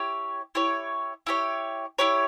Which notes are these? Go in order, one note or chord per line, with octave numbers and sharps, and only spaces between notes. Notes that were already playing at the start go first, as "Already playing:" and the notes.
Already playing: E4 G4 C#5
E4 G4 C#5
E4 G4 C#5
E4 G4 C#5